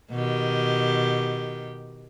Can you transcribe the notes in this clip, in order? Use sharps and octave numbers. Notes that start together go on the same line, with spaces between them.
B2 D#3 G4